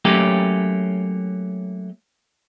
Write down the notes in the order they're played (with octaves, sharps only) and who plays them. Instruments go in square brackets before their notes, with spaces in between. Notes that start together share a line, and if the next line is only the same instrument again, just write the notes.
[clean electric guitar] F#3 A3 A#3 C#4 G4